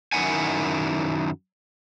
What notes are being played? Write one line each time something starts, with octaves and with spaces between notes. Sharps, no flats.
F#2 D#3 E4 F#5 G#5